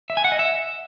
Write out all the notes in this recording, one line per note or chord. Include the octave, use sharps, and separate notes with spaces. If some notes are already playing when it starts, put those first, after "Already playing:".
E5
G#5
F#5
D#5
E5